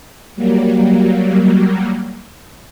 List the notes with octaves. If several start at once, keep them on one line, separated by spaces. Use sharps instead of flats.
F#3 G3 A#3